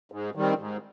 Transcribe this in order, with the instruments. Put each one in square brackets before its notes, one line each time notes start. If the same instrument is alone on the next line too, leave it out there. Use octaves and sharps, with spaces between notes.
[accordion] G#2
D#3 G3 C4
G#2